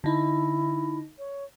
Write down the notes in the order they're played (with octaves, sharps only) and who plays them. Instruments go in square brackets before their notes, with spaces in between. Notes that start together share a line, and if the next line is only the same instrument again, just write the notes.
[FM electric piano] D3 D#4 [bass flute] E4
[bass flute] C#5